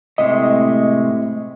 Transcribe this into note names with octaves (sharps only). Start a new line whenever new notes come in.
A2 C3 G#3 D#5